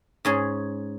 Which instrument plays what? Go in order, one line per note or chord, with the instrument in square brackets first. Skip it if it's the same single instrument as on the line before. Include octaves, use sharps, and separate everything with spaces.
[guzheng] G#2 C#4 G#4